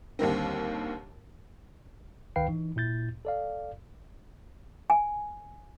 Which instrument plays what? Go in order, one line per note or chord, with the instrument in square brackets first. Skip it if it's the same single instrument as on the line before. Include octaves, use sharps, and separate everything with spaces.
[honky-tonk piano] D#2 D3 D#3 G3 A#3 C4
[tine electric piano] C#2 D#3 B4 F5 G5 C7
E3 D#4
A#2 E4 G6 A6
A4 D5 F5
[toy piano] G#5